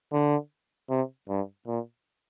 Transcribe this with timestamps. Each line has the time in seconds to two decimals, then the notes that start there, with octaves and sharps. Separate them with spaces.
0.13 D3
0.90 C3
1.29 G2
1.67 A#2